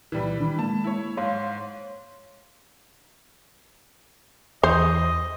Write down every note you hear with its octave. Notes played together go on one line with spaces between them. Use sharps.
C#2 A#2 E3 G3 B4
D#3 D4
G#3 A#3 A5
E4 C#5
G#2 C#5 F5 C6
E2 C5 D#5